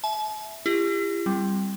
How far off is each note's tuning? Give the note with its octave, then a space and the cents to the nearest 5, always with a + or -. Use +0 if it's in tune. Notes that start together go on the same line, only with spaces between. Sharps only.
E5 +0 A5 -45
E4 +45 G4 +40
G3 +0 C4 +0